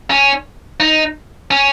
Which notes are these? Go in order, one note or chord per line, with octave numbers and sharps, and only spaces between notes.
C#4
D#4
C#4